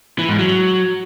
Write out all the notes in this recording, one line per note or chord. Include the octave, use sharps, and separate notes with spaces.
E3
G#2
F#3